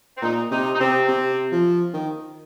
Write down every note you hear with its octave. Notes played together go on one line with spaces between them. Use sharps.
C4
A#2 D#4
C3 D#4
D#4
C3 C4
C3
F3
D#3